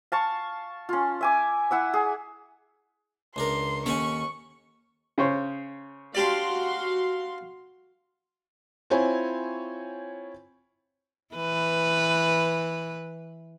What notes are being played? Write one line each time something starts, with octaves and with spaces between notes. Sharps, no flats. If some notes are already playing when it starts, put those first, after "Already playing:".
F5 A5 C#6
C#4 F4
E5 G#5 D6
E4 F#5 E6
G#4
C#2 D4 A#4 C6
D#2 C#4 A4 F#5 G#5 C#6
C#3 C5 C#5
D4 F#4 G4 D5 F5 C6
C4 E4 F4 C5 C#5 G#5
E3 B4